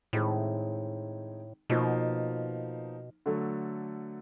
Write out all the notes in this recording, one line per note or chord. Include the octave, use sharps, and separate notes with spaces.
A2 D#3 G#3 C4 D#4
B2 F3 A#3 D#4
D3 F#3 A3